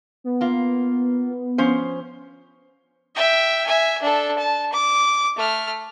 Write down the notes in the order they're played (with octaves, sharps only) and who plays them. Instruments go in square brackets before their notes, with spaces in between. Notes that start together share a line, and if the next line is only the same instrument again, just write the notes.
[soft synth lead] B3
[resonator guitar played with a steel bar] A#3 F4
F3 C#4 C5
[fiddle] E5 G5
E5 G#5
D4 A4
A5
D6
A3 F6